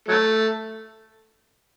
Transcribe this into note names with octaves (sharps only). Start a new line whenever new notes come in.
F#3 A3